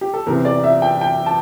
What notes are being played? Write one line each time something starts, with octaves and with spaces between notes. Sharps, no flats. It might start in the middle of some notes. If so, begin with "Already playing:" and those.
G4
A4
E2 C3 E3 A#4
D5
E5
G5
G5
A5